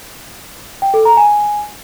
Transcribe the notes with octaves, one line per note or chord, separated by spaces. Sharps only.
G5
A4
A#5
G#5